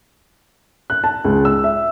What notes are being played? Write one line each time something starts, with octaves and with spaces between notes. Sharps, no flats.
F#6
A5
C#2
E6
E5